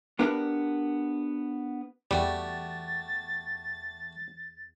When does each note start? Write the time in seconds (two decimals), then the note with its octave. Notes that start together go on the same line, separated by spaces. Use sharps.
0.19 B3 D4 G4 A#4 B4
2.11 E2 G3 A3 F#4 G4 A6